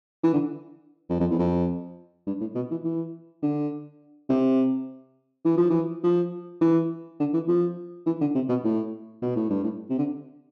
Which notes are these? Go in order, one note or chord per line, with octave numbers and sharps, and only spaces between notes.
E3
D3
F2
F2
E2
F2
G2
A2
B2
E3
E3
D3
C3
E3
F3
E3
F3
E3
D3
E3
F3
E3
D3
C3
B2
A2
B2
A2
G2
A2
C3
D3